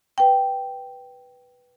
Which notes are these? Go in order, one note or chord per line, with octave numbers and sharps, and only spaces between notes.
B4 G5